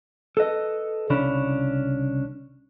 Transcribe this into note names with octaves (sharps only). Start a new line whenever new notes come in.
A4 B4 D#5
C2 C#3 C#4 D4 B5